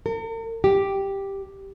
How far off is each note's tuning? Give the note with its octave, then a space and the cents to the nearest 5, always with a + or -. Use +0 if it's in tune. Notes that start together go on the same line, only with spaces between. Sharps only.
A#4 -45
G4 +0